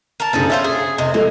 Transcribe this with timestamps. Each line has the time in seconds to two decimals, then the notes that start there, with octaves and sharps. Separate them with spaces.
0.20 A#4 A5
0.33 F#1 G2 C#3 G3 G#4 A4
0.50 C#4 F4 C5 E5
0.64 G#4
0.98 F1 C3 D#5
1.14 F3 G#3 A#3 A4